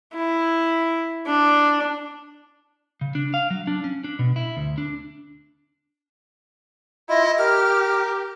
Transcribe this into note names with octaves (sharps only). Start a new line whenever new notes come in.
E4
D4
C#3
D4
F5
F#3
D4
C#4
D4
B2
E4
D2
D4
E4 F4 D#5
G4 A#4 F6